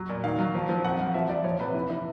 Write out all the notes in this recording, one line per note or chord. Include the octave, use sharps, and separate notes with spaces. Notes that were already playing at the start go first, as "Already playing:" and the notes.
Already playing: F#3
A#2
D#3 F5
F#3
F3
F3
F2 F#5
F#3 F5
F3 E5
F3 D5
F3 C#5
C3 B4
E3
E3 E5